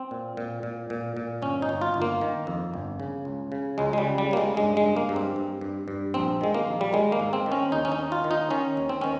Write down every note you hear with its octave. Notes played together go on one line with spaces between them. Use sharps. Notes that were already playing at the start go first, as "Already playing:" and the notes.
Already playing: C4
A#2
A#2
A#2
A#2
A#2
G1 C#4
D#4
G1
F4
G1
A#3
D#3
F2
G1
C#3
C#2
C#3
C#2 G#3
G#3
G3
C#3
G3
C#3 A#3
G#3
G2 G#3
G#3
G2
A#3
G2
C4
G2
G2
G2
A#1 C4
D#3 G#3
A#3
A#1
G3
D#3 G#3
A#3
G#2
C4
D#3
C#4
D#2 D#4
C#4
D#4
D#3
F4
D#3
D#4
D#3 C#4
D#2
C4
D#3 C#4